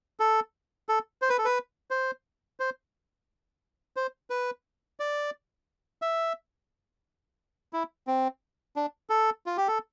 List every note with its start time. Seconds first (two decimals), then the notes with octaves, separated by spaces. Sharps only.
0.20 A4
0.89 A4
1.22 C5
1.29 B4
1.38 A4
1.45 B4
1.91 C5
2.60 C5
3.96 C5
4.30 B4
5.00 D5
6.02 E5
7.73 E4
8.07 C4
8.76 D4
9.10 A4
9.46 F4
9.57 G4
9.68 A4